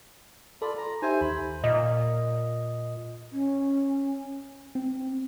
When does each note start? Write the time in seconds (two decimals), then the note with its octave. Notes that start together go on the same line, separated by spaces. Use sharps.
0.62 F4 A4 D5 B5
0.77 A#5
1.02 D#4 G4 C5 E5 G#5
1.21 D#2 B5
1.64 A#2 D#5
3.30 C#4
4.75 C4